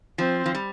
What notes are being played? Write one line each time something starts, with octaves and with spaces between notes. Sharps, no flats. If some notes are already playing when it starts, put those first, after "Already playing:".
F3 C4
F3
G3